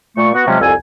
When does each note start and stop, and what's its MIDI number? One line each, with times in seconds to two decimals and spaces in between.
0.16 0.30 46
0.16 0.30 57
0.16 0.30 85
0.34 0.44 59
0.34 0.44 66
0.47 0.60 48
0.47 0.60 53
0.47 0.60 54
0.47 0.60 56
0.47 0.60 61
0.61 0.73 36
0.61 0.73 41
0.61 0.73 69
0.61 0.73 80